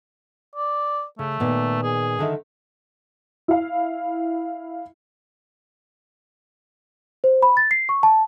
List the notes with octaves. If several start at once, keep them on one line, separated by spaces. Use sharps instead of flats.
D5
C#3 A3
A#2 D#3 B3
G#4
D3 D#3 E5
E4 F5
C5
B5
A6
C7
C#6
A5